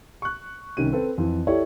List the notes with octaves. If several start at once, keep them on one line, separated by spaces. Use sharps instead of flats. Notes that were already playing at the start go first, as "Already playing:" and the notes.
C#6 F#6
C2 D#3 C#4 D#7
C4 A4 B4
F2 E3
E4 G4 A4 C#5 D5